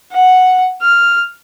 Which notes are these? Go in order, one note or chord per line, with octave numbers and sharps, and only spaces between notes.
F#5
F6